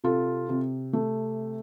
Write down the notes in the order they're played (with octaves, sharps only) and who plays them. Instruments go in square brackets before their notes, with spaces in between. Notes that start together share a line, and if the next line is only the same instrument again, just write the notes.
[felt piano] C3 F4 A4
C3
A3